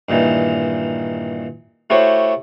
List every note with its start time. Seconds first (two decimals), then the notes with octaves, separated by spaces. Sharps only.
0.09 G2 A#2 D#3 E3
1.90 A3 E4 F#4 G4 C5 C#5